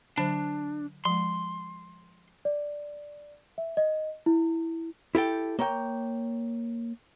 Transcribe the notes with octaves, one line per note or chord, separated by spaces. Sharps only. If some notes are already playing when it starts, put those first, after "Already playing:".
D3 F#3 D4 C5
F3 G#3 C6
D5
E5
D#5
E4
E4 G4 A4 G5
A#3 C#5 G5